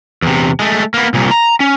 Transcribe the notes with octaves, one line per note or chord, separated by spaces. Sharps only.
E2 C3
G#3 A3
A#3 B3
C2 A#2
A#5
C#4